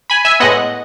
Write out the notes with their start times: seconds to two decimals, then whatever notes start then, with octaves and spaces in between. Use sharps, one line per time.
0.10 G#5 B5
0.25 E5 G#5
0.40 A2 G#3 B3 D#5 F#5